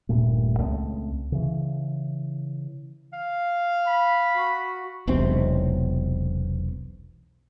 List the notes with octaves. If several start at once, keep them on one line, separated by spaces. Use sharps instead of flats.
D#1 G2 A#2 A3
C#2 A3 A#3 C4
C#3 E3
F5
B5
F#4
E1 B1 C3 C4